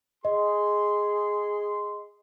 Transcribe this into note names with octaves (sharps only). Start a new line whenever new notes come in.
G#4 D#5 C6